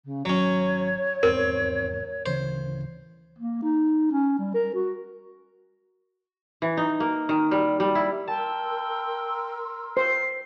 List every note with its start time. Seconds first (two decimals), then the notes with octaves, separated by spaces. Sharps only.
0.04 C#3
0.25 G#1 F#3 C#4 C#5
1.23 F1 E2 G#2 C4 A#4
2.26 D1 C#3 E3 C5
3.39 A#3
3.62 D#4
4.12 C#4
4.39 G3
4.54 A#4
4.75 F#4
6.62 E3
6.77 D#4
7.00 A#3
7.29 D#3
7.51 G3
7.80 G3
7.95 E4
8.28 A#4 G5 A5 C6 E6
9.97 C5 C7